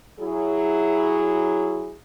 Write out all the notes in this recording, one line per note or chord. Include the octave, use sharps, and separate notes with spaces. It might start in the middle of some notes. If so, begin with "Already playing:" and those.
F#3 E4 G#4